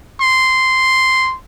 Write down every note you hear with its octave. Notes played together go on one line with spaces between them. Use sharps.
C6